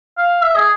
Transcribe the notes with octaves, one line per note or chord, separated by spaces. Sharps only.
F5
E5
G#4